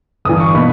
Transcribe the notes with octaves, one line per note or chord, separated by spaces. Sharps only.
G1 G2 E3 D#6
C#6
B2 A#3 D#4 B5